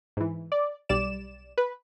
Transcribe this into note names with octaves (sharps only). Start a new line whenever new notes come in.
G#2 E3
D5
B1 G3 D5 E7
B4